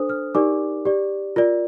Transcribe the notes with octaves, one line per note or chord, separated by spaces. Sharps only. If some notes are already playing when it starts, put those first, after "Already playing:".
Already playing: D4 A4 C5 D#6
F6
D#4 G4 A#4 D5 D6
G4 D5
F4 A#4 D5